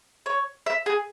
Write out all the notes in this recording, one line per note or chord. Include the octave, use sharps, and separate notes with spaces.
C#5
E5
G#4